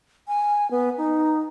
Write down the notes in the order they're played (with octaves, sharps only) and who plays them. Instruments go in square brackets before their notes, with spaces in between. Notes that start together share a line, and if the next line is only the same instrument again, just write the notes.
[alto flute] G#5
B3
D#4